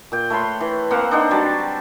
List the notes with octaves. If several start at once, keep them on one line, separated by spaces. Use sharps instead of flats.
A#2 G5
A3 B4 C#5 C6
E3
A#3 C4 F5 F#5
D4 D#4 C5 F#5
F#3 G3 D4 A5